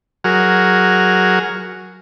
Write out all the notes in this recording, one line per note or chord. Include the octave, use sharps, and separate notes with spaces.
F#3 F#4 G#4 A#4 F6